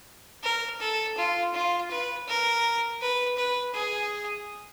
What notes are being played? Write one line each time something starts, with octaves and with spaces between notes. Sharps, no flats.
A#4
A4
F4
F4
B4
A#4
B4
B4
G#4